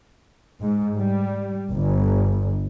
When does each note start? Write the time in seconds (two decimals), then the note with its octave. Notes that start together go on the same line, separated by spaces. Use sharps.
0.61 G#2
0.96 G3
1.72 G1